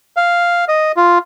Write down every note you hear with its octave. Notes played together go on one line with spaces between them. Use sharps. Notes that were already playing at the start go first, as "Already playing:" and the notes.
F5
D#5
F4